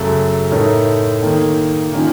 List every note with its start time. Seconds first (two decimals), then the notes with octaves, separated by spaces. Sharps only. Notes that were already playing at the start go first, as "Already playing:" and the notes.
Already playing: F#2 C#3 A3
0.51 A2 A3 D#4 A#4 C#5
1.22 D#3 A#3 D#4 A4
1.92 D#3 A#3 C#4 F4